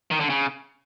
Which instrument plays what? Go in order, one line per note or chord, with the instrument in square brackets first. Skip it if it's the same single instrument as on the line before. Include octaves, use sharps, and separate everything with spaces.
[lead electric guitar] D#3
D3
C#3